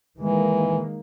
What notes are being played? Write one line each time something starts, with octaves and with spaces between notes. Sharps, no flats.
D#3 E3 G#3 A#3